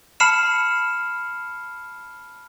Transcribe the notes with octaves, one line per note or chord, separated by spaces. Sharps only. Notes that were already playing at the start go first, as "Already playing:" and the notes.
A5 B5 F6 C7 C#7 E7